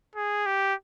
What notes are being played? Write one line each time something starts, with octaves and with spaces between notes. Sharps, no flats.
G#4
G4